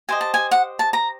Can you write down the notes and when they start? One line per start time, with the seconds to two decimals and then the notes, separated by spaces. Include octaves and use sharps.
0.09 G4 C5 D#5 G#5
0.21 A5
0.34 G#5
0.51 F#5
0.79 A5
0.93 A#5